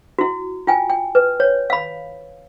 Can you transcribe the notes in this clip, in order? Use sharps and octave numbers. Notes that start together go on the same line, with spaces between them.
E4 F#4
F4 G5 G#5
G5
B4
C#5
F5 B5